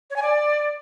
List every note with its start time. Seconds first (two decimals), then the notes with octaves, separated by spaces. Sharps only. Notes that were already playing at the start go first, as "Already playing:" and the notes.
0.10 C#5
0.16 G#5
0.22 D5